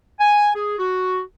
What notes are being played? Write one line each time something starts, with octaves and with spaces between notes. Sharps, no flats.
G#5
G#4
F#4